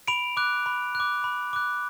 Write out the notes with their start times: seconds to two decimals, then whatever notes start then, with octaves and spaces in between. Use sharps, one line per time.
0.08 B5 D7 F7
0.37 D6 F#6
0.66 B5
0.95 D6 F#6
1.24 B5
1.53 D6 F#6